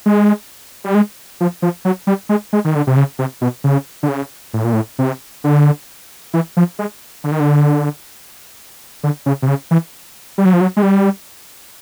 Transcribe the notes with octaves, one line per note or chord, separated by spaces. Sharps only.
G#3
G3
G#3
F3
F3
F#3
G3
G#3
G#3
D#3
D3
C3
C#3
C3
B2
C#3
D3
C#3
A2
A#2
A2
C3
D3
E3
F3
G#3
D3
D#3
D3
D3
C#3
C3
C#3
E3
G3
F#3
F3
F#3
G#3
G3